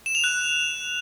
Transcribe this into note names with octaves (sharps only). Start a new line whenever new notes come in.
E7
F7
F#6